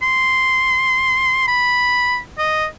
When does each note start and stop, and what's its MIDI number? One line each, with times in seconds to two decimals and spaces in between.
0.02 1.46 84
1.48 2.18 83
2.38 2.65 75